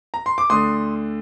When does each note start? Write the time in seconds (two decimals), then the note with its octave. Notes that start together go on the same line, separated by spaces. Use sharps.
0.14 A#5
0.26 C6
0.38 D6
0.50 D2 D3 C6 D#6